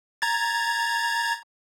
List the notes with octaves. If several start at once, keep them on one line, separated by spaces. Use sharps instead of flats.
A#5 G#6 A6